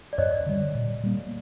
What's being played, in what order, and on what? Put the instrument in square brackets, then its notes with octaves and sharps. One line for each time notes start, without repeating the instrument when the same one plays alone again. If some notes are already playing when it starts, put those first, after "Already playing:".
[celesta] D5
[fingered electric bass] F#2 [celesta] C#5 D#5
[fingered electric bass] D3 G3
A#2
G3 A#3